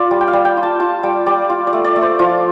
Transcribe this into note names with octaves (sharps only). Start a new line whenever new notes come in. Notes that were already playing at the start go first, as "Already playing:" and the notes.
Already playing: F4 D5
G3
G5
F5
G3
G5
F4
A5
F4 A5
G3 G5
G3 D5
F4
D5
A3
D5
A3
C5
F3 F4